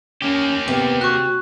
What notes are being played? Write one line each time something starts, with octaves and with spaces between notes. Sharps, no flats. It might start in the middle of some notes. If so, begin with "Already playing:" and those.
A#3 C#4 G4
C3 B3
F#4 C#6 F#6